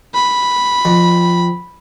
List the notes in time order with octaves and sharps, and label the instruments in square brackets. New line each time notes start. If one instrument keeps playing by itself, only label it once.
[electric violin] B5
[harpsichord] F2